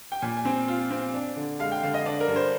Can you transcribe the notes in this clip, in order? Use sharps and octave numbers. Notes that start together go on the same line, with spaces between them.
G5
A#2 G#5
G#5
C4
F4
C4
D4
D3
G#3 F5
G5
D3 F5
D#5
D4 D5
A#4
G2
C5